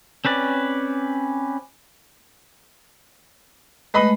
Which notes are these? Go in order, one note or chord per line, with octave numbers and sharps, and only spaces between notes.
C4 C#4 B4 D5
G#3 A3 B4 D#5 B5